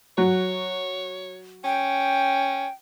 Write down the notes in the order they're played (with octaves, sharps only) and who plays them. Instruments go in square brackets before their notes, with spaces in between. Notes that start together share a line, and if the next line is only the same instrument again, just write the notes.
[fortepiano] F#3 [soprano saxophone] C#5
[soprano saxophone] C#4 [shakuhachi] G5